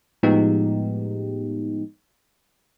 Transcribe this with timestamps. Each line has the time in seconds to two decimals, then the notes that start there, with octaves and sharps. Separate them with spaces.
0.23 A2 F3 G#3 B3 D#4 G4